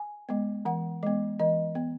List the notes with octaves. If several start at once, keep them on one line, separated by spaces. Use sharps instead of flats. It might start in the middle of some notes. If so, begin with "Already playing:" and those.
Already playing: G#5
G#3 B3
E3 F#5
G#3 B3
E3 D#5
B3